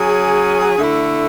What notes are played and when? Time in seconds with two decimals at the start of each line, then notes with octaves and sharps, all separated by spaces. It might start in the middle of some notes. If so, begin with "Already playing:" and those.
Already playing: F#3 C#4 G#4
0.79 D3 A3 E4